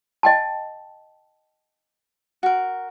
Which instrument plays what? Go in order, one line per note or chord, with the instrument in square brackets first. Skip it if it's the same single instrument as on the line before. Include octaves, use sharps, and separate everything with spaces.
[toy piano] D#5 G5 A5
[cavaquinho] F#4 A#4